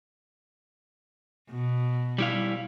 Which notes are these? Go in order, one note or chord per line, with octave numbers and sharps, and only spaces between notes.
B2
G3 E4 F5